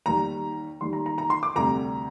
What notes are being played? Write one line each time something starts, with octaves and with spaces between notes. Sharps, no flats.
D#2 D#3 G3 A#5
D#2 D#3 G3 C6
A#5
A#5
A#5
C6
D6
D2 C3 G3 A#5